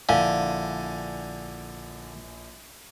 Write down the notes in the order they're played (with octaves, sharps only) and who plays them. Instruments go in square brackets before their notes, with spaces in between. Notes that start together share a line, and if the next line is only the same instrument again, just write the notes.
[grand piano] A#1 E4 G#5 [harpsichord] D3 [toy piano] F5